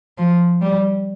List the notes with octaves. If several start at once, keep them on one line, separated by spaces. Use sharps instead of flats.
F3
G3